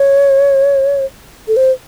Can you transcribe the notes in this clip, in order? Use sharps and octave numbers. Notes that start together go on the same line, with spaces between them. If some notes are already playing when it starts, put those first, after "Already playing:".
Already playing: C#5
A4
C5